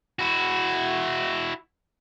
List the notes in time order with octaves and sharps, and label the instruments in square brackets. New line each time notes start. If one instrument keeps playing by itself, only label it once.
[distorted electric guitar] E4 F#4